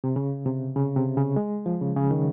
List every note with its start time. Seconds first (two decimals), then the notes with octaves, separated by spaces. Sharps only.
0.04 C3
0.16 C#3
0.46 C3
0.76 C#3
0.96 C3
1.17 C#3
1.36 G#3
1.66 F3
1.81 C#3
1.96 C#3
2.11 D#3